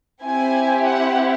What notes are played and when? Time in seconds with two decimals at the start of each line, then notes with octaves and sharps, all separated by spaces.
0.22 C4 E4 G4 G#5
0.86 F#5